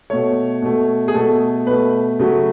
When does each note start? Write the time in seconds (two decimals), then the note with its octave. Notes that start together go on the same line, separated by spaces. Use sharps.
0.10 B2 A3 C#5
0.62 B2 A3
1.08 G#4
1.14 B2 A3 A4
1.66 B2 A3 B4
2.19 C#3 F#3 A3